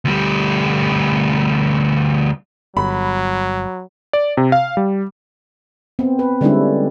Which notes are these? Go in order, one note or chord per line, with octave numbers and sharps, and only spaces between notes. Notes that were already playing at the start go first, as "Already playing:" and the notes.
D2 G3
G1 F#3 B5
D5
C3
F5
G3
B3 C4
B4
D3 G3 G#3 C#4 D4 E4